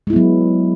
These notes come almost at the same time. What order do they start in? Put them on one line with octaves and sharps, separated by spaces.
G#3 E4 B3 F#3